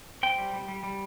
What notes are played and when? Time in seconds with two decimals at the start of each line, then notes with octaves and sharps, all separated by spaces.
0.23 C4 G5
0.38 G3
0.53 G3
0.69 G3
0.83 G3